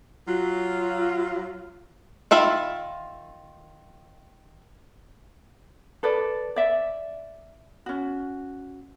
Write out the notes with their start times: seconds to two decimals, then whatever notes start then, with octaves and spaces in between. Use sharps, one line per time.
0.27 F#3 F4
2.31 D#3 F4 E5 B5
6.03 A4 B4 D5
6.56 D5 E5
7.86 C#4 F#4